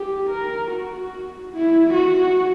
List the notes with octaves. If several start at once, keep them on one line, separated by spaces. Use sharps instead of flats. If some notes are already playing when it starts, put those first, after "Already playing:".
Already playing: G4
A#4
F#4
E4
F#4